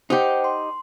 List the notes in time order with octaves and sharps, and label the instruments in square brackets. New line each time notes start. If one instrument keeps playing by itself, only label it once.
[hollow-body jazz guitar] D#4 G4 [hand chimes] C5 F#5 G5
[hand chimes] C6